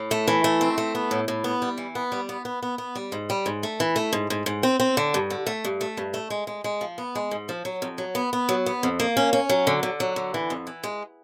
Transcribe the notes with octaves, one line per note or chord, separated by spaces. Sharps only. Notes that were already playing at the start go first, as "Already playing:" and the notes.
Already playing: A2
A3
E3
A3
C4
A3
B3
A2
A2
B3
G3
E3
B3
G3
B3
B3
B3
B3
G3
G#2
G3
G#2
A3
E3
A3
G#2
G#2
G#2
C4
C4
D3
G2
D3
A3
G2
A3
G2
A3
G#3
G#3
G#3
F3
B3
G#3
G#2
F3
F#3
F2
F#3
B3
B3
F#3
B3
F2
A#3
C#4
C#4
F#3
D3
D3
F#3
D3
E3
F2
E3
G#3